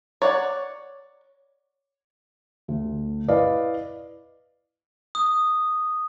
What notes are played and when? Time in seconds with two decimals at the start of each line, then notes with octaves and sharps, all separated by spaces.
0.22 C#5 D5 F#5
2.68 D2
3.28 E4 B4 D5 D#5 F5
5.15 D#6